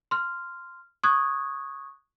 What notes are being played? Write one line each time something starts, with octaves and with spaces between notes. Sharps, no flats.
C6 F6
C#6 D#6 F#6 G#6